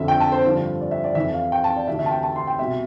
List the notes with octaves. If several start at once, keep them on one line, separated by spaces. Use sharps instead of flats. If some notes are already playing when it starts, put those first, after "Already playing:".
Already playing: F2 D3 F3 E5
G5
A5
C5
G2 D3 F3
D5
E5
D5
F2 E3 E5
F5
G5
A5
D5
D2 C3 E3 E5
E5
A5
G5
A5
C6
G5
C2 B2 E5